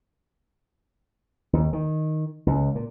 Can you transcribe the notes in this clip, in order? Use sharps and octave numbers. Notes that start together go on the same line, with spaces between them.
D#2
D#3
C#2
A#2